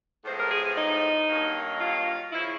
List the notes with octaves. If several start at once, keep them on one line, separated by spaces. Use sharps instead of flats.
A2 F3 G#3 B3 C5
A#4
G#4
D#4
G2 D#3 F#3 A#3
F4
C#3 F3 E4